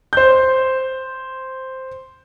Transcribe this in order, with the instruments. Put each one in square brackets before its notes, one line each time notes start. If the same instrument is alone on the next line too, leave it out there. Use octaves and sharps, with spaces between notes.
[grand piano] C5 G6